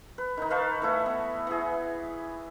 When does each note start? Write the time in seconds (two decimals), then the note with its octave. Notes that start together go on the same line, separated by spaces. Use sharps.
0.18 B4
0.37 D#3 D#4
0.50 B4 F5 A5 C#6
0.82 E3 A3 E4
1.06 B3
1.47 E3 G#4